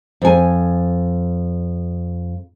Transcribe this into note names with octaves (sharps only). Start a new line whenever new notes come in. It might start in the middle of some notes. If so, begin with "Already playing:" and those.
F2 G#5